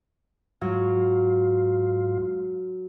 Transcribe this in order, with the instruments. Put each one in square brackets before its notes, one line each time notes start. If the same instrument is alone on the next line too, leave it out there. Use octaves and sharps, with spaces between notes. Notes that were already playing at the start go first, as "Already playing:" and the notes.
[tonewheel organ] G#2 F4 [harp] F#3